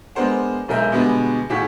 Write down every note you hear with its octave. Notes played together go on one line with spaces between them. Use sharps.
G#3 B3 D4 A#4 C5 F#5
E1 B1 G#3 A#4 E5 G6
B2 D3 G3 G#3 B3
G1 A2 D#3 F#4 G#4 B6